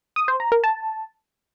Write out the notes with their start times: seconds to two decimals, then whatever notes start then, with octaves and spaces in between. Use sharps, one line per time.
0.16 D#6
0.28 C5
0.40 A#5
0.52 A#4
0.64 A5